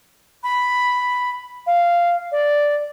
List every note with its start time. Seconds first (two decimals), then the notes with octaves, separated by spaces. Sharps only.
0.43 B5
1.67 F5
2.32 D5